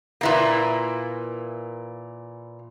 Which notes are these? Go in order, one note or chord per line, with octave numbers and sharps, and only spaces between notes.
A#2 E3 A#3